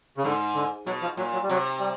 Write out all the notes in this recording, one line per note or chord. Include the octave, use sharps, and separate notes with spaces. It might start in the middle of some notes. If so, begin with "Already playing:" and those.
C#3
G#2 D3
D3
B2 F#3
F3
A#2 F#3
F#3
G3
C3 F#3
G3